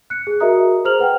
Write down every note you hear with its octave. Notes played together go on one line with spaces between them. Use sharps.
F#6 C#7
G#4
F#4 A#4 D#5 E5 A#5 D#6
G#4 C5 A#5 F6 F7 F#7
B4 F#5 G5